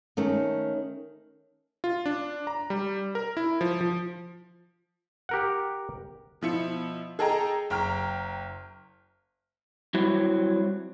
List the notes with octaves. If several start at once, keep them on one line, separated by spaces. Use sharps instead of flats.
D#3 A3 C#4
F4
D4
A#5
G3
A#4
E4
F3
F3
G4 A#4 F#5
B2 F3 E4 C#7
G#4 A4 D#5 G5 A#5
F#1 G5 A#5 F6
F#3 G3 C4 E4 F#4